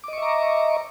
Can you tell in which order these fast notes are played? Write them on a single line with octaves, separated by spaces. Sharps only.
D6 D#5 C#6 E5 A#5